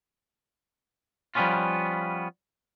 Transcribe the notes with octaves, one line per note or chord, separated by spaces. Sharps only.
F3 G3 A3 B3 C#4 F4